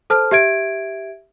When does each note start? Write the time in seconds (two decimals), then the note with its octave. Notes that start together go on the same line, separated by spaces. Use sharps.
0.10 A4 C5 A5 F6
0.31 G4 E5 G#6 D7